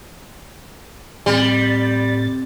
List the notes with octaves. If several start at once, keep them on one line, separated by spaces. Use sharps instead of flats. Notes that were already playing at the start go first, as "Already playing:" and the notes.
A2 G3 C4 A6